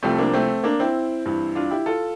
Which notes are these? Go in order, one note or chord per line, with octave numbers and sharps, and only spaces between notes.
C2 C3 F3 A3 C4
A#3 D4
A3 C4
A#3 D4
C4 E4
G2 E3
D4 F4
E4 G4
F4 A4